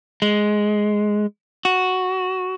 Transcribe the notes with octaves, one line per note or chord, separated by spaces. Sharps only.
G#3
F#4